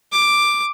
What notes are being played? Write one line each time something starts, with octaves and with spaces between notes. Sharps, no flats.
D6